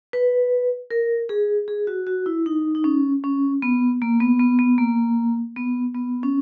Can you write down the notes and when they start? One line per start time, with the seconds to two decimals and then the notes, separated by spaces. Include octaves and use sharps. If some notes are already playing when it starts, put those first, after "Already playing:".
0.13 B4
0.91 A#4
1.29 G#4
1.68 G#4
1.87 F#4
2.07 F#4
2.26 E4
2.46 D#4
2.75 D#4
2.84 C#4
3.24 C#4
3.62 B3
4.02 A#3
4.21 B3
4.39 B3
4.59 B3
4.78 A#3
5.56 B3
5.95 B3
6.23 C#4